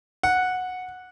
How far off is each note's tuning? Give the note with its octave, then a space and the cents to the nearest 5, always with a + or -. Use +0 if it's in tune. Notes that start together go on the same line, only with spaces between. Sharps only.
F#5 -10